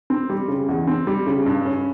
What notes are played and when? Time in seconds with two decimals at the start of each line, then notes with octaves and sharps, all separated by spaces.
0.10 C4
0.30 G3
0.48 C#3
0.69 E2
0.87 C4
1.07 G3
1.27 C#3
1.46 G2
1.65 C#4